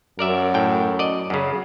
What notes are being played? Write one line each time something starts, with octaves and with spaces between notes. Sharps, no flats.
F#2 A#4 D5 E5
A2 G5
D5 D#5
F#2 C#3